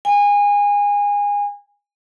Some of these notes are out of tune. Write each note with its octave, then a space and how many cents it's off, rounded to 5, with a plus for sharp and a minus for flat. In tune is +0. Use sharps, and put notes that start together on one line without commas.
G#5 -25